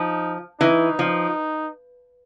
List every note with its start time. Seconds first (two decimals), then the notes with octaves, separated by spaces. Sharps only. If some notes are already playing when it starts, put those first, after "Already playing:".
Already playing: F3 D#4
0.60 E3 D#4
0.99 F3